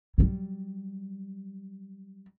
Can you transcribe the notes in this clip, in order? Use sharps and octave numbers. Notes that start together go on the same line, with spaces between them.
F#3 G3